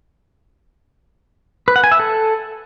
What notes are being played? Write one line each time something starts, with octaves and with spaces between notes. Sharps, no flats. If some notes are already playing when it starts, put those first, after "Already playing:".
B4
F#5
G#5
E5
A4